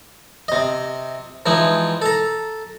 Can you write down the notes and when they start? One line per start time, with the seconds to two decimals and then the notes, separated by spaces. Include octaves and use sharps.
0.48 C3 D#5
1.46 E3 F3 G#3 D#4 E4
2.02 A4 A#5